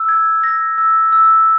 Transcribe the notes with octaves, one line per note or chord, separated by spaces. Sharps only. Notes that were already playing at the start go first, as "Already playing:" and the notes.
Already playing: E6
G#6
A#6
E6
E6